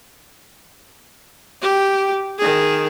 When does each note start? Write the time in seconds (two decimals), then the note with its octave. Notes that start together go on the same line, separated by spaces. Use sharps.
1.62 G4
2.39 D#3 G#4